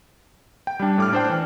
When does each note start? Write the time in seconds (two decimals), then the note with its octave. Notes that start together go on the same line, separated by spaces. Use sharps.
0.67 G5
0.79 G3 D4
0.98 A2 D6 F6
1.13 D4 C5 G5
1.29 E3